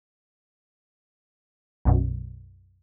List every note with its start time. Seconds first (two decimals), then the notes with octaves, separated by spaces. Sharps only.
1.85 B1 F#2 B2